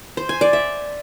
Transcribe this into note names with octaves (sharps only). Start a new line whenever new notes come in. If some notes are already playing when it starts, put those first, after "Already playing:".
C5
G#5
D5
E5